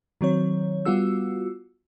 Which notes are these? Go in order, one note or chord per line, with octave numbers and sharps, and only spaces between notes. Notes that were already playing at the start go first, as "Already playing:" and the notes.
D#3 F#3 C4 C#5
G3 B3 F4 F#4 E6